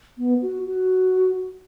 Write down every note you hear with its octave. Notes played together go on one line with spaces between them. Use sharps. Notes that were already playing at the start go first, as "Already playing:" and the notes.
B3
F#4
F#4